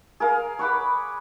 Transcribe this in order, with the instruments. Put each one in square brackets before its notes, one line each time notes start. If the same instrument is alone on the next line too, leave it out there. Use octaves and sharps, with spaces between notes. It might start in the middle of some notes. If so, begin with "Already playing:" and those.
[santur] G#4 A#4 F5
C#5 F#5 B5 D6